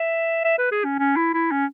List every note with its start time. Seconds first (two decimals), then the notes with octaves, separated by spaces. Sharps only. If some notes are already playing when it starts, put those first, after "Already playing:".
Already playing: E5
0.44 E5
0.58 B4
0.72 G#4
0.85 C#4
0.99 C#4
1.16 E4
1.34 E4
1.51 C#4